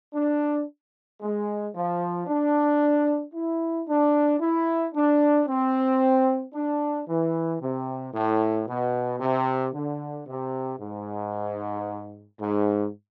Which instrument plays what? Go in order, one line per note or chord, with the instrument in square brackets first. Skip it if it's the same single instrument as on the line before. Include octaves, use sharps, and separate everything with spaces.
[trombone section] D4
G#3
F3
D4
E4
D4
E4
D4
C4
D4
E3
C3
A2
B2
C3
D3
C3
G#2
G#2